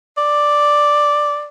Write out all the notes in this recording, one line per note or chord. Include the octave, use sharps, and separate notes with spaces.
D5